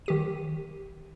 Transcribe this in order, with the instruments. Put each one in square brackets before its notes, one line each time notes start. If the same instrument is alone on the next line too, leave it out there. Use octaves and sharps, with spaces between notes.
[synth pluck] D#3 G4 D#7